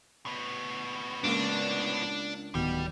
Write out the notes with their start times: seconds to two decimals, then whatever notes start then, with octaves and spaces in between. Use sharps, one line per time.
0.26 A2 B3
1.24 C#2 A#3 D4 D#6
2.55 D1 B2 D#3 G3